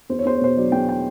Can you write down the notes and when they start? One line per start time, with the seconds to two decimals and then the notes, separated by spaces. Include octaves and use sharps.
0.09 E2 C5
0.19 C#5
0.25 E2 C5
0.35 C#5
0.41 B2 C5
0.57 F#3 D5
0.72 E2 G5
0.89 G5